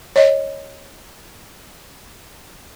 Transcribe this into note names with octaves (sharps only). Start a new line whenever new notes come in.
C#5 D#5